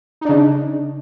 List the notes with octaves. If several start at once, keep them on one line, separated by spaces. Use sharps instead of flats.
C#3 D4 D#4